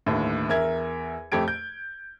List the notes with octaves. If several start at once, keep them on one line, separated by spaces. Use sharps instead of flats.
G1 D#2 A2
E2 A#4 E5 G#6
F2 A3 G4 G#6 D7
G6